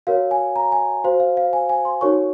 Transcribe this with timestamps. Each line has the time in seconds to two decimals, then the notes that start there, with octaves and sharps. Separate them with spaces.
0.07 F#4 A#4 C#5 F5
0.31 G#5
0.56 A#5
0.72 G#5
1.04 F#4 C5 F5
1.20 F5
1.37 F5
1.53 G#5
1.69 G#5
1.85 C6
2.01 D#4 F#4 A#4 C#5 C#6